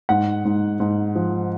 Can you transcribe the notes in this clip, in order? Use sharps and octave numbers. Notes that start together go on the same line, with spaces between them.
G#2 F#5
G#2
G#2
F3